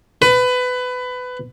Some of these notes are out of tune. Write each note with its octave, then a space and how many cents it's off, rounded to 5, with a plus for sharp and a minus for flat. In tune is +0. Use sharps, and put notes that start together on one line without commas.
B4 +20